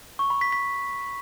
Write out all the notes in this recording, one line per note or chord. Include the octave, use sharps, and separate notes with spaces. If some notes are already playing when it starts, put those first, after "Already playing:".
C#6
B5
B6
B6